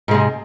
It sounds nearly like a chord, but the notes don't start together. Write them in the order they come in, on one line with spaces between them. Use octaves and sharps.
G#2 G#3 C3